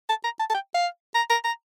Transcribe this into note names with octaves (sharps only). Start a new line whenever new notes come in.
A5
A#5
A5
A5
G5
F5
A#5
A#5
A#5